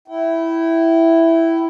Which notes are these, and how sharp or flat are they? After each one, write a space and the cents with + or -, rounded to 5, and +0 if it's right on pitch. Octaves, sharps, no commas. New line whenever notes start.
E4 +0 G5 -35